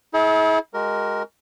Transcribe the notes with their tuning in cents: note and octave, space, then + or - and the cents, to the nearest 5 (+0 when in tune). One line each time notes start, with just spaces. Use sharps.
E4 -40 G#4 +40
G#3 +5 F#4 +30 A#4 +0